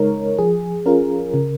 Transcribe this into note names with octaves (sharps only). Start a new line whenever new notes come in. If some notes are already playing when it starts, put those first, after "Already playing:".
Already playing: C#3 G#3 D#4 A#4 C#5
F3 G#4
C#4 F4 A#4
C#3